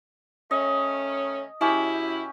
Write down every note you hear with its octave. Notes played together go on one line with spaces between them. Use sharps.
D#3 A3 C#4 D#5
F#2 C#4 E4 G4